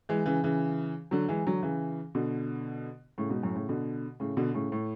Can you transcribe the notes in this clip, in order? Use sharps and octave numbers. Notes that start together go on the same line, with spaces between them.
E3 G#3
C#3 E3
C#3 E3
D3 F#3
E3 G#3
D3 F#3
C#3 E3
B2 D3
A2 C#3
G#2 B2
F#2 A2
A2 C#3
B2 D3
A2 C#3
B2 D3
A2 C#3
A2